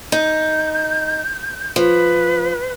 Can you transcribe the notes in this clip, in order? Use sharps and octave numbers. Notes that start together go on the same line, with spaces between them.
D#4 G6
F3 B4